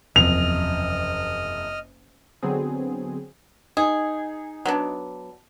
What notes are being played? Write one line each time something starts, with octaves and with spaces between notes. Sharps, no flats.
F#1 E2 C3 F3 D#5 F6 F7
D3 F#3 B3 C4 G#4
D#4 G#4
F#3 B3 D4